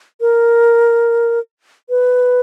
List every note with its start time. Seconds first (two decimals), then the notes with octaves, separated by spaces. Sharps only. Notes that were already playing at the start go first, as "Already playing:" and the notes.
0.21 A#4
1.90 B4